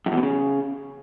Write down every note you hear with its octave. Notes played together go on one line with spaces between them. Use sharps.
F#2
E2
B2
C#3